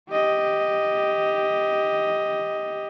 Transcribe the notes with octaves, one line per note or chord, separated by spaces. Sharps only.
G4 D#5